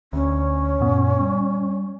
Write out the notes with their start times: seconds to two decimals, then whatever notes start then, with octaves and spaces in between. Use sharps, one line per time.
0.13 D2 C#4
0.80 F#2 A#2 B3
1.20 G3